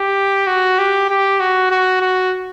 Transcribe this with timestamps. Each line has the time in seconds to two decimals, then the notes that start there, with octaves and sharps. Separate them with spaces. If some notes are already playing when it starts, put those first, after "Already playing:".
Already playing: G4
0.47 F#4
0.78 G4
1.09 G4
1.40 F#4
1.71 F#4
2.01 F#4